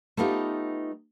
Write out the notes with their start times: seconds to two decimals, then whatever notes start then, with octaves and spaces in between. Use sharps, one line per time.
0.17 A3 B3 D#4 F4 G4